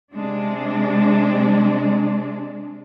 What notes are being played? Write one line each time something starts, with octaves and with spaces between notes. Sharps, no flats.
C3 G#3 D4